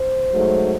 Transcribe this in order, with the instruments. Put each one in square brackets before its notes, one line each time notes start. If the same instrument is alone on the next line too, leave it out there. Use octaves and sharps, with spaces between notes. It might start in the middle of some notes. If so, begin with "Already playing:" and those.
Already playing: [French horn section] C5
G#2 F#3 A3